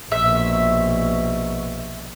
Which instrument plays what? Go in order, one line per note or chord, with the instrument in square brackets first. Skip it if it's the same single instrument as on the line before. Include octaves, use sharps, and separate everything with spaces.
[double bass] A#1 B2 [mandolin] E5